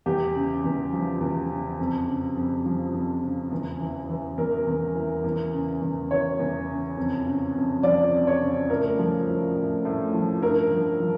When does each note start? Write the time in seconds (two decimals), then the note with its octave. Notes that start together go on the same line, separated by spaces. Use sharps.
0.06 E2 G4
0.35 C#3
0.64 E2
0.93 F3
1.21 E2
1.50 C#3
1.79 F2
2.08 C#3
2.37 F2
2.65 F3
2.94 F2
3.23 C#3
3.52 E2
3.80 E3
4.09 E3
4.38 E2 A#4
4.67 E2
4.95 E3
5.24 E2
5.53 C#3
5.82 E2
6.11 E3 C#5
6.39 E2
6.69 C#3
6.97 F2
7.26 C#3
7.55 F2
7.83 F3 D5
8.12 F2
8.27 C#5
8.42 C#3
8.70 A2 A#4
8.99 F3
9.28 F3
9.56 A2
9.85 A2
10.14 F3
10.42 G2 A#4
10.71 F3
11.00 F3